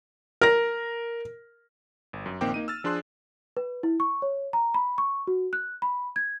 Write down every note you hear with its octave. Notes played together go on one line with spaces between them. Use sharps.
A#4 A#6
G1
F#2
A#1 D#3 A#3 C4 G5 D6
A#3 D#4 D#7
E6 F6 A6
F3 D4 G#4 C6 F#6
B4
E4
C#6
C#5
A#5
B5
C#6
F#4
F#6
B5
G#6